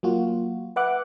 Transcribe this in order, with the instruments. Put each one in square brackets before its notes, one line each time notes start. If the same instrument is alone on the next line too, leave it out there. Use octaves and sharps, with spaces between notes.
[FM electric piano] F#3 A#3 F4 F#4
B4 E5 F#5 D6 F#6